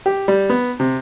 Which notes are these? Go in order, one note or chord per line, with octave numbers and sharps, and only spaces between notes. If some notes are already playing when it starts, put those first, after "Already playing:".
G4
G3
B3
C3